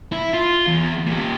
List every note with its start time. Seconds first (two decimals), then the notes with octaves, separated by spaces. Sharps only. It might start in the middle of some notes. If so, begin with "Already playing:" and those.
0.12 E4
0.34 F4
0.67 E2
1.06 A#2 G4